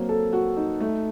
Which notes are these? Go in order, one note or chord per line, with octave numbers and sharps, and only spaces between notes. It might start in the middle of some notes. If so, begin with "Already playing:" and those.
Already playing: F#3 A#3 C4
A4
F#4
D#4
A3